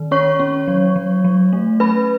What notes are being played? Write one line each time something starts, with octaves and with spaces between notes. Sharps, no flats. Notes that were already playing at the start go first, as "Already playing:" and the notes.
Already playing: D#3
C#4 C#5 C#6
C#4
F#3
F#3
F#3
A3
C#4 B4 B5